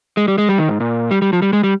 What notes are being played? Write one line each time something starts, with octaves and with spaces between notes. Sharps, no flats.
G#3
G3
G#3
G3
D#3
G#2
A#2
G3
G3
F3
G3
G#3
G3